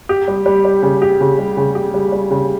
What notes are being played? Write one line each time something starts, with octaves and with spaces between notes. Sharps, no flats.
G4
G3
G3
G3
C#3
G4
C#3
G3
C#3
G4
G3
G3
C#3